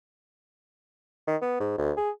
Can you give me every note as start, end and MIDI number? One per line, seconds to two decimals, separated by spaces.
1.27 1.36 51
1.42 1.56 59
1.60 1.75 44
1.78 1.92 38
1.97 2.10 68